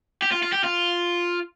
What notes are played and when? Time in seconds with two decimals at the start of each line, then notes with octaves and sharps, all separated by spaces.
0.22 G4
0.32 F4
0.43 F4
0.53 G4
0.64 F4